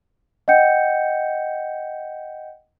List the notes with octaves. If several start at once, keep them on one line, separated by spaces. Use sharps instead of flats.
D#5 F#5 G5 G6 C#7